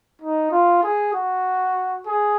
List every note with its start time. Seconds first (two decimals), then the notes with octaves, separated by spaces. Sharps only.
0.22 D#4
0.51 F4
0.83 G#4
1.14 F#4
2.06 G#4